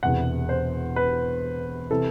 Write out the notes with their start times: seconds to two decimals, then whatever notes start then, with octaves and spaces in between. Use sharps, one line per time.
0.03 E1 E2 C3 F#5
0.49 C5
0.96 B4
1.91 C3 E3 A4